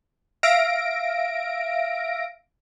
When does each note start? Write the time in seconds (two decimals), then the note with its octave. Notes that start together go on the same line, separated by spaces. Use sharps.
0.43 E5 F5 A#6 D7